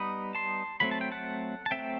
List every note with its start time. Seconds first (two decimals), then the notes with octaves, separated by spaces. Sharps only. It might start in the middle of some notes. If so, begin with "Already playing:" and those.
Already playing: G3 B3 D#4 B5 D#6
0.35 A5 C6
0.80 F#3 A3 C4 B5
0.91 A5
1.01 G5
1.12 F#5 A5
1.66 A5
1.71 F#3 A3 C4 E5 G5